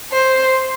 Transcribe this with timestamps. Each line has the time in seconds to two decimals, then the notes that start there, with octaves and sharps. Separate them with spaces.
0.12 C5